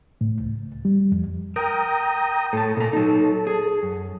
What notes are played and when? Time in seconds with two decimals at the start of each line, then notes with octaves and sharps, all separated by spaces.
0.21 A2
0.40 C#2
0.85 G3
1.12 F2
1.56 A#4 G5 A#5 D#6
2.53 A2 A4 A5
2.77 A#2 A#5
2.93 F#3 D#4
3.47 G#4
3.83 F#2